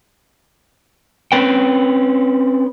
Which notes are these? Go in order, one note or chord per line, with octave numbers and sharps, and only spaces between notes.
C4 C#4 B4 G5